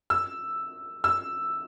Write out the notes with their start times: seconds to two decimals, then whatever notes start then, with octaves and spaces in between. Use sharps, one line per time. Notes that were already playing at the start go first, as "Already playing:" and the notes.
0.10 E6
1.04 E6